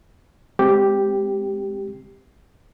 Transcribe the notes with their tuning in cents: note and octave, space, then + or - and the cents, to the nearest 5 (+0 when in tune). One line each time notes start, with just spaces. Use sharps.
G#3 -5 C4 +0 G4 +0